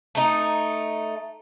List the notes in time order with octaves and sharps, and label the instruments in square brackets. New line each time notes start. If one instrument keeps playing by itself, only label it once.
[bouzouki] A3 D#4